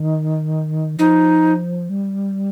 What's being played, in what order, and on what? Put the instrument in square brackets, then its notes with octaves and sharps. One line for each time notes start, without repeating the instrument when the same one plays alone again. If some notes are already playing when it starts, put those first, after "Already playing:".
Already playing: [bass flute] D#3
[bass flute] F3 [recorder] D#4
[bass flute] G3